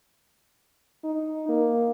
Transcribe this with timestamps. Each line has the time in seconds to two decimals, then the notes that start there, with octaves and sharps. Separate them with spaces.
1.04 D#4
1.49 A#3